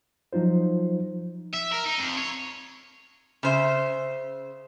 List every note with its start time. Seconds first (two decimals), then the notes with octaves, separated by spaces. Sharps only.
0.33 F3 F#3 D#4 F4 C5
1.54 E5
1.72 A#4
1.86 D#4
1.99 F2
2.17 C#5
3.43 C#3 C5 E5